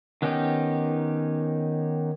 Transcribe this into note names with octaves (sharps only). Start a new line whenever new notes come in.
D#3 B3 C#4 D#4 G4